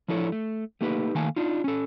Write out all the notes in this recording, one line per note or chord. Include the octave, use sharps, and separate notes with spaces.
F3 D4 E4 A4 A#4 C#5
A3
A3 A#3 D#4 G4 B4
D#3 A3 A#3 F5 G#5 A5
D4 D#4 F4
C#4 A4